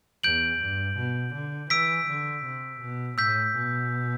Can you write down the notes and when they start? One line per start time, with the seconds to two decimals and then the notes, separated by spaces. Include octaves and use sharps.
0.24 E2 G6 D7 F#7
0.60 G2
0.97 B2
1.34 D3
1.70 E3 E6 B6 D7
2.08 D3
2.45 C3
2.81 B2
3.18 A2 E6 G6 B6
3.55 B2